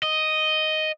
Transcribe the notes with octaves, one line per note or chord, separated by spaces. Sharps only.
D#5